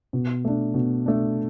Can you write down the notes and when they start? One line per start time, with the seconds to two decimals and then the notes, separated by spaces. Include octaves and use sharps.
0.13 B2
0.45 A3 D4
0.74 B2
1.06 A3 D4